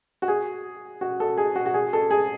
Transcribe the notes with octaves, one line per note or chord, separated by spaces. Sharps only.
F#4
G#4
F#4
A4
G#4
F#4
F#4
G#4
A4
G#4